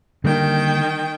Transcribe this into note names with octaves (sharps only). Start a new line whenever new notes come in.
D3 D#3 G3 A#3 G5